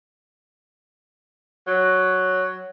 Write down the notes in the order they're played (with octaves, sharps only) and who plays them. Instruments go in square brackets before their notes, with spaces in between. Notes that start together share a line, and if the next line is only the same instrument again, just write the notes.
[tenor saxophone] F#3